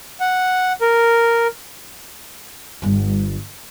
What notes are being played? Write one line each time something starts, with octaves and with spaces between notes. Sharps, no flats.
F#5
A#4
G1 G3